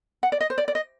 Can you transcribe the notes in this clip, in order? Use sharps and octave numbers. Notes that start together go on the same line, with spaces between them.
F#5
D5
D#5
C5
D5
D5
D#5